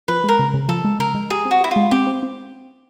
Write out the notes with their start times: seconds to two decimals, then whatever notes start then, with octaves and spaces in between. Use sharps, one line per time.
0.08 F3 B4
0.24 G#3 A#4
0.39 C#3
0.54 C#3
0.69 F3 A4
0.85 G#3
0.99 C#3 A#4
1.15 G#3
1.30 G4 G#4
1.45 C4
1.51 F#4
1.61 E4 G4
1.71 G#3 F4
1.91 C4 G4
2.07 C4
2.23 C4